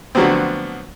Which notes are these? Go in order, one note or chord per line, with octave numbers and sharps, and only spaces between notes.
D3 F3 F#3 A3 B3 C4